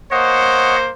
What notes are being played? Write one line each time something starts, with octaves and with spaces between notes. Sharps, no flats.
A#3 C5 C#5 D#5 F#5